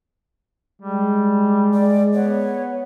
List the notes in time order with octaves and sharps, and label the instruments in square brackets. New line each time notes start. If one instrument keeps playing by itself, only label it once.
[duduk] G3 [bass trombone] G#3
[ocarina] D5
[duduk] B3 [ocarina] C#5